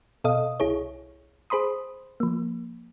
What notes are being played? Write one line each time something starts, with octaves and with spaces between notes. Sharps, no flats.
B2 A4 D#5 F5 D#6
C2 E4 G#4 C#5
G#4 C5 B5 C6 D#6
F3 A#3